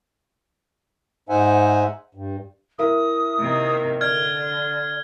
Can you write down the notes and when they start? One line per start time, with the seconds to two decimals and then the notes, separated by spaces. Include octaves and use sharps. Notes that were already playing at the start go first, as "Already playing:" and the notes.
1.29 G#2 D#4 C5 E5 F#5 G#5
2.15 G2
2.79 E4 A#4 E5 D#6
3.39 C3 D#3 A#3
4.01 D3 D5 F6 G#6